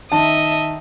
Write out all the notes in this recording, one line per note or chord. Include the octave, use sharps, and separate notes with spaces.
D#3 D#5 E5 A5